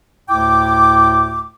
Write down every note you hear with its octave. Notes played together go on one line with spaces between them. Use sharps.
D2 A2 E4 G5 D6